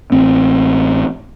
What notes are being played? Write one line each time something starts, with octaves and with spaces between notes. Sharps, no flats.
A1 C4